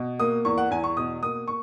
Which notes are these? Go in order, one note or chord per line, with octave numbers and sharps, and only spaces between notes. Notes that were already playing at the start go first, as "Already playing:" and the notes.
Already playing: B2
A#3 D#6
E2 C#6
F#5
E2 G#5
C#6
B2 D#6
A#3 D#6
C#6